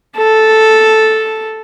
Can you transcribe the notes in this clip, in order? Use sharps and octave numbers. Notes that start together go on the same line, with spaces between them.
A4